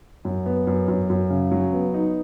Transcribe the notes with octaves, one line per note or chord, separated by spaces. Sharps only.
F#2
B3
F#2
F#2
F#2
C#3
F#3
B3
D#4